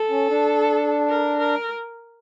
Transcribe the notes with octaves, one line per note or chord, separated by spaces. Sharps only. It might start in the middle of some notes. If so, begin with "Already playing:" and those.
Already playing: A4
C#4
D4
A#4
A#4